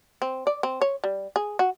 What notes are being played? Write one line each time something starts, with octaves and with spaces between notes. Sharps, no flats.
C4
D5
C4
C#5
G3
G#4
F#4